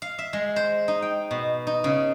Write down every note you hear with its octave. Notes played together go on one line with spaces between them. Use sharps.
F5
E5
G#3
C5
D#4
G5
B2
D#4
C#3